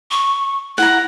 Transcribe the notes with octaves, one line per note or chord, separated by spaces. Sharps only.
C#6
E4 F#5 A#5